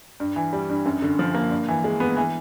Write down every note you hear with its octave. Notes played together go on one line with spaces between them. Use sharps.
G2
E3
G3
G2
F#2
D3
F3
A#3
G2
E3
G#3
B3
E3